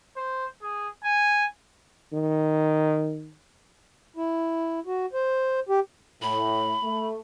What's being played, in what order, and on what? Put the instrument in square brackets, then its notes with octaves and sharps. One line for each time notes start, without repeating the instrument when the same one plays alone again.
[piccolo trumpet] C5
G#4
G#5
[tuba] D#3
[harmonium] E4
F#4
C5
G4
[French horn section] A2 [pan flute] B5
[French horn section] A3